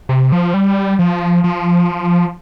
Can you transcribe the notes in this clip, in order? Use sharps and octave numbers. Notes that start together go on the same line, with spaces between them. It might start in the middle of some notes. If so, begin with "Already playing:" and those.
C3
F3
G3
F3
F3